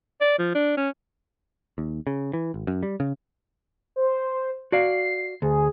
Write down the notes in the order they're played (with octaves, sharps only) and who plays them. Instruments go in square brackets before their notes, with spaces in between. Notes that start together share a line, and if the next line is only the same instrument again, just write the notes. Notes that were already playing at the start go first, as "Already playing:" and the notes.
[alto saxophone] D5
F3
D4
C#4
[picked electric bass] D#2
C#3
E3
G#1
F#2
G3
C#3
[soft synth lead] C5
[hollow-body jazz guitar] F#4 D5 F5 [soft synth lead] C7
[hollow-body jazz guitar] D2 [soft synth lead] G#4